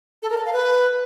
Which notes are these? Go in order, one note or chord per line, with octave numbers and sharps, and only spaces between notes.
A4
A#4
A5
F5
B4